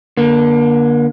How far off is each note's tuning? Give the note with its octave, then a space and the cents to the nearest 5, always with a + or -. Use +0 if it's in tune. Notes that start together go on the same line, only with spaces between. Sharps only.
D3 +0 A#3 +30